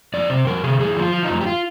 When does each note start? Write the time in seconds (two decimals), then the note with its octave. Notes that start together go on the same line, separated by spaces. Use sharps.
0.14 F2 D5
0.30 C3 C5
0.47 F2 A#4
0.63 C3 G#4
0.80 F2 G#4
0.97 F3
1.02 F4
1.14 F3
1.24 D#4
1.30 F2
1.41 G4
1.47 F4